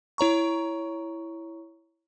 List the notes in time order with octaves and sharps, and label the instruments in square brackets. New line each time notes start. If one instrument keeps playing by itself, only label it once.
[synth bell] E4 C#5 A#5 C#6